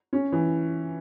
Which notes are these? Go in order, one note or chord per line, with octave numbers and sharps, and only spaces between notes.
C#4
E3